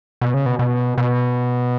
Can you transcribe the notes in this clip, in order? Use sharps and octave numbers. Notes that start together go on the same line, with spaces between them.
B2
C#3
B2
B2
B2